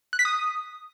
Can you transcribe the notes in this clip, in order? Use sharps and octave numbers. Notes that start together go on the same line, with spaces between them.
F#6
B6
D#6